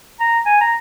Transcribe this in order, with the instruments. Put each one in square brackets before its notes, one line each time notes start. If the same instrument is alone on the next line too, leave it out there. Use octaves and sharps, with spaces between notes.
[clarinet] A#5
G#5
A#5